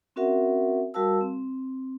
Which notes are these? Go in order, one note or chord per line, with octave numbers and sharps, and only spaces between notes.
C4 C#4 F#4 A#4 E5 F#5
G3 F#4 A#4 F5 A5 E6
C4